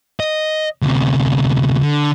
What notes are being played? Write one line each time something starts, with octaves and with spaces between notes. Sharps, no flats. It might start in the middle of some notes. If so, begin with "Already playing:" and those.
D#5
D2 C3
D3